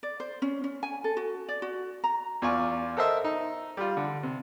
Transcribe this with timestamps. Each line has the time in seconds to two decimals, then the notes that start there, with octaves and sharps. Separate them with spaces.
0.03 D5
0.20 C5
0.42 C#4
0.64 C#4
0.83 G#5
1.04 A4
1.17 F#4
1.49 D5
1.62 F#4
2.04 A#5
2.42 E2 F4 D5 G#5 C#6
2.97 A4 A#4 C5 D#5 E5
3.24 D#4
3.77 G3 F4
3.97 D3
4.23 C3